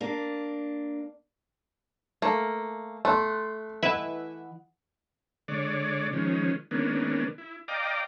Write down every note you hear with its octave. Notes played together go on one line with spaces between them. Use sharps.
A#3 D4
A3 A#3
A3 C6 F#6
E3 E4 B4 D#5 E5 F#5
D3 G#3 C#5 D5
D#3 F3 G#3 C#4
D#3 G#3 A#3 B3 C#4 D4
E4
D5 D#5 F5 G5 A#5 D6